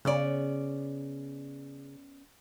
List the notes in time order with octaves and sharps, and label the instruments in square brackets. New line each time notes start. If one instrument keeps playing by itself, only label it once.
[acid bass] C#3 [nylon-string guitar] B3 C#4 D5